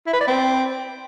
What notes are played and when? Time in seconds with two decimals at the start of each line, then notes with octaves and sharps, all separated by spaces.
0.06 E4
0.13 B4
0.20 D5
0.27 C4